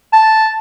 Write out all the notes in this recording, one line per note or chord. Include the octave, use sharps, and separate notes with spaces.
A5